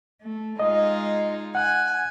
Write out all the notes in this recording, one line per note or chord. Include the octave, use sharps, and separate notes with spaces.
A3
G#3 D#4 F4 D#5
F#5 G#5 F#6